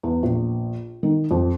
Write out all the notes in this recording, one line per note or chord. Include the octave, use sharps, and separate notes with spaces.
E2
A#1
D#3
F2